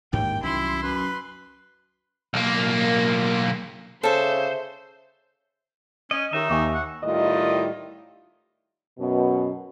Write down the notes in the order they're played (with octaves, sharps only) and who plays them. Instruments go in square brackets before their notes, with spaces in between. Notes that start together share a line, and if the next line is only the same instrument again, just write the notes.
[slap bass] A1 G#2 G#3 [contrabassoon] D#2 [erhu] G5
[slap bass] C2 D#3 [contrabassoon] F#2 [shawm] E4 [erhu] C6
[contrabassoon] F#2 [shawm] B4
[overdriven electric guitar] B1 A#3
[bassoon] C#3 [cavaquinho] A4 E5 [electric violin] C5
[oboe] C#4 [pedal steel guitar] D#5
[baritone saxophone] D#3 [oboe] D#4 [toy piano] G4 C#5 A#5 [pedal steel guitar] E5
[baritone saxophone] D#2 [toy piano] G#5 C#6 D6
[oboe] F#5
[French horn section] A2 D#3 G3 E4 F4 D#5
F#2 B2